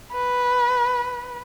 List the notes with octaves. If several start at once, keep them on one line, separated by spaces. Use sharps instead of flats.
B4